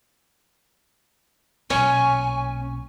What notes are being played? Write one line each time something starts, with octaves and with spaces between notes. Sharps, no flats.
B1 A#2 C#4 C#5 G#5